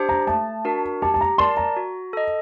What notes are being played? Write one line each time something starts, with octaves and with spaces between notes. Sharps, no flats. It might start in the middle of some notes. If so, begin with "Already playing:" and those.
Already playing: D4 G4 C5
A#5
A3 A5
D4 F#4 A#4
G4 A5
A5
A#5
A#4 D5 A5 C6
A#5
F#4
A4 D#5